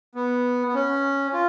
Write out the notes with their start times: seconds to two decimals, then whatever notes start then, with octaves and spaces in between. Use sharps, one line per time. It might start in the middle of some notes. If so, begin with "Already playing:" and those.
0.15 B3
0.67 B3
0.74 C#4
1.33 F4